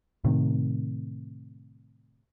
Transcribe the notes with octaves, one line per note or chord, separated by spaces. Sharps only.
A2 C3 D#3